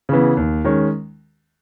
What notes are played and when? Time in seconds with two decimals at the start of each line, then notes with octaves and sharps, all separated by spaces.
0.09 C#3 E3 B3
0.37 D#2
0.65 D#3 G#3 C#4